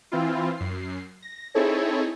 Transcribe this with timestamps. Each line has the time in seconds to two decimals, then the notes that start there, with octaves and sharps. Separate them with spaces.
0.12 E3 C4 E4 F4
0.57 F#2 C7
1.22 A#6
1.55 C4 D#4 E4 G#4 A4 C#5